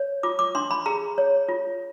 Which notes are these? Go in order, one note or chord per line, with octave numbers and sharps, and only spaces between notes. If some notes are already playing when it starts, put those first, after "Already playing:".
Already playing: C#5
F4 D6
D6
D4 C6
B5
G#4 A#5
C#5
F4